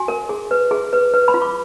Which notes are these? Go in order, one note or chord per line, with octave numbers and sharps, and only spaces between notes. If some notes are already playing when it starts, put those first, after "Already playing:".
Already playing: F#4 G#5
A#4
G#4
B4
G#4
B4
B4
B5
F4
D6